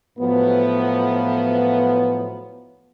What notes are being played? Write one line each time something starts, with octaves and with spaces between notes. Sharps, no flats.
A2 F3 F#3 B3